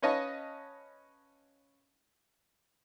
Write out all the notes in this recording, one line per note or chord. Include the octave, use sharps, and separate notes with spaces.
C#4 B4 C#5 D#5 F5 A5